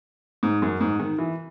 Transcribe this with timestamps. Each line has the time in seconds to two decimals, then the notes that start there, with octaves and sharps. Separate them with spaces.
0.43 G#2
0.62 F#2
0.81 G#2
1.00 D#3
1.19 E3